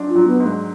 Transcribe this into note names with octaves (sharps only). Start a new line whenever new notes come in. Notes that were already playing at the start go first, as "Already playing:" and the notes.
Already playing: G#2 F#3 D4 F#4
F4
F#3
B3
G#2
G#3